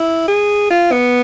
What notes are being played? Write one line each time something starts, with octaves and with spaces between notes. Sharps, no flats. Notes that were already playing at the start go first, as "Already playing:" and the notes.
Already playing: E4
G#4
F4
B3